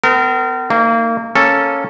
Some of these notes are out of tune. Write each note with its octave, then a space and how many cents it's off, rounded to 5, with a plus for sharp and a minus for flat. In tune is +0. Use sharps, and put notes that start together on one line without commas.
B3 +45 A#4 -30
A#3 -30 D#4 +5
A#3 +0 C#4 +0 A4 +0